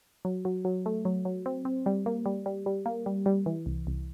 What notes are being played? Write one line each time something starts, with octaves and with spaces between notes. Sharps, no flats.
F#3
F#3
F#3
A3
F#3
F#3
C4
C4
G3
A#3
G3
G3
G3
A#3
G3
G3
E3
C2
C2